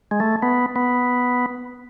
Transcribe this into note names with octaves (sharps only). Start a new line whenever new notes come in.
G#3
A3
B3
B3